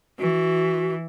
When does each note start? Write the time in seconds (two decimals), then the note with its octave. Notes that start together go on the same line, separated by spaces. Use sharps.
0.18 E3 F#4